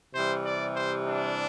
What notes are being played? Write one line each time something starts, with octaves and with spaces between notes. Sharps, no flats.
C3 E3 G3 C5
D5
C5
D4